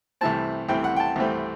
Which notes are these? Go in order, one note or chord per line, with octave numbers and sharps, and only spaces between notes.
C2 C3 E3 A3 C4 A5
C2 C3 E3 A3 C4 G5
F#5
G5
A5
C2 C3 E3 A3 C4